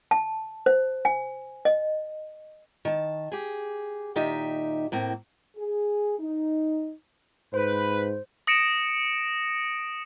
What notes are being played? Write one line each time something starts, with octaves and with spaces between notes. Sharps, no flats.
A5
C5
G#5
D#5
D#3 A5
G4 G#4
A#2 D#3 D#4 G4 E5
A2 A#3 C4
G#4
D#4
G#2 B4 C5
D#6 A#6 C#7 D7 E7